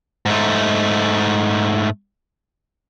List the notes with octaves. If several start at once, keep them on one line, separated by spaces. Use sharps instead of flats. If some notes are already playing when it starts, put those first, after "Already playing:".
G#2 A3